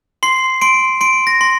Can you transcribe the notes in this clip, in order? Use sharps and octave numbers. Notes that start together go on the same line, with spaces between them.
C6 C7
C6 D7
C6 D7
A#6
C6